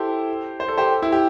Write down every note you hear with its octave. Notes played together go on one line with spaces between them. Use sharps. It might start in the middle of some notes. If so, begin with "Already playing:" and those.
Already playing: E4 G4 A4 C5
C5
A4
G4 C5
E4
G4